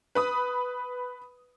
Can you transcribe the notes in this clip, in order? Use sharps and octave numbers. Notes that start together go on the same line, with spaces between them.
B4 B5 D#6